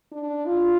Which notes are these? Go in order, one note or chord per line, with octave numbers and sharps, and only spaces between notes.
D4
F4